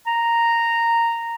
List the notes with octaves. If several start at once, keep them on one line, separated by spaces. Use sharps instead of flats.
A#5